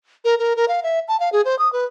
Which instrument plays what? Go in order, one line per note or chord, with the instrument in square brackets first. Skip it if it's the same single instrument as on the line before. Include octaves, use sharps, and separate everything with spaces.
[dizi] A#4
A#4
A#4
F5
E5
A5
F5
G#4
C5
D#6
B4